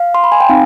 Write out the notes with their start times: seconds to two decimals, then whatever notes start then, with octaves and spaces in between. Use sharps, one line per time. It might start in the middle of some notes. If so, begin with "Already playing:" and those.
Already playing: F5
0.15 C6
0.24 B5
0.32 G#5
0.40 G5
0.49 C4 D#4 F5